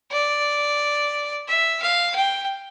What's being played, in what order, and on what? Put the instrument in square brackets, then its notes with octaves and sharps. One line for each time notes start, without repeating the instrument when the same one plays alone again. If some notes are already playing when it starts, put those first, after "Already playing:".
[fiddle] D5
E5
F5
G5